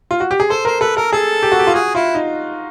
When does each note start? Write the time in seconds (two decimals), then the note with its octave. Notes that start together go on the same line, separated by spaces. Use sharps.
0.11 F4
0.20 F#4
0.31 G4
0.40 G#4
0.50 A4 C5
0.65 A#4 C5
0.81 A4 B4
0.96 A4 A#4
1.13 G#4 A4
1.43 G4
1.52 F#4
1.59 G4
1.67 F4
1.74 F#4 G#4
1.95 E4 F4
2.15 D#4